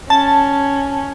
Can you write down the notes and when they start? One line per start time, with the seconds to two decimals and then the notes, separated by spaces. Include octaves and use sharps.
0.10 C#4 A5